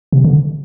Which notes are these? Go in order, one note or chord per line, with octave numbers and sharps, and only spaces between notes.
C3
D3